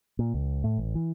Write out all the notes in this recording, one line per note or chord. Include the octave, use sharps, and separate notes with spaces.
A#2
C#2
A2
A1
E3